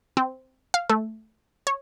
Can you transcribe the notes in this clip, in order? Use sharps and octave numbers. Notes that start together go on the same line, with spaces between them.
C4
F5
A3
C#5